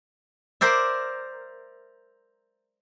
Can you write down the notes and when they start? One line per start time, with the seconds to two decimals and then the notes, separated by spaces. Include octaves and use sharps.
0.61 A#4 C5 D5 E5